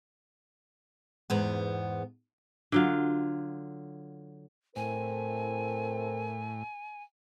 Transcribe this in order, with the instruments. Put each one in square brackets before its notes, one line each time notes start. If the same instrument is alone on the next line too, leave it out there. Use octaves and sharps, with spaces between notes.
[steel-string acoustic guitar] E2 G#2 B3
[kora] D3 F#3 F4
[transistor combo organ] A2 [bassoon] C4 [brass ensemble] E4 A4 A#4 [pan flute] G#5